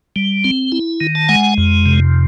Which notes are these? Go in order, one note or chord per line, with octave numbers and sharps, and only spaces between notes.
G3
C4
E4
D#3
A5
G#3 F#5 G#5
F2
C3